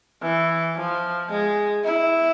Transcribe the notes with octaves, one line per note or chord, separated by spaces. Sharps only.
E3
F3
G#3
E4